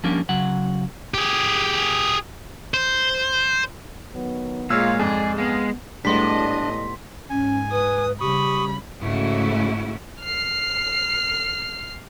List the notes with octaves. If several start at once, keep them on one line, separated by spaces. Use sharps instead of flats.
F3 G3 A#3 C#4 D4
C#3 F#3 F#5
G4 G#4
C5
D#3 F#3 B3
A#2 G#3 F4 C#5 F5 E6
F2 G#2 G#4 D5
G#3 B3 F5
A2 G3 G#3 B3 D4 D#5 C6 B6
G#2 C#4 G#5
B4 D#6
C#3 G3 G4 B5 C#6 D#6
G#2 C#3 A3 E4 F#4
F6 C7